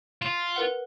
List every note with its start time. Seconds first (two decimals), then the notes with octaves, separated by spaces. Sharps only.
0.22 F4 E7
0.56 A#4 B4 F#5